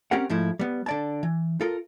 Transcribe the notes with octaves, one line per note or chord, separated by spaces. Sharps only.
C4 C#4 G4 A#4 F#5
G#2 F3 A3 E4
G3 B3
D3 D5 A5
E3
F4 A4 A#4